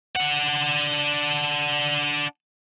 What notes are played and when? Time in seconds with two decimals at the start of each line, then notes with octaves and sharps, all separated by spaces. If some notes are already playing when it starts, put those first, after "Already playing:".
0.15 D4 F#5